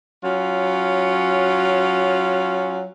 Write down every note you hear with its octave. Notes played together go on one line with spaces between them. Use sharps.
F#3 C#4 F4